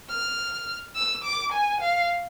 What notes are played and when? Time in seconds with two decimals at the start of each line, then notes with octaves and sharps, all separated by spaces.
0.10 F6
0.96 E6
1.24 D6
1.53 G#5
1.81 F5